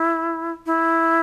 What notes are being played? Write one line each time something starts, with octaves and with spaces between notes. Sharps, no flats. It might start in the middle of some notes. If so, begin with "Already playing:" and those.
Already playing: E4
E4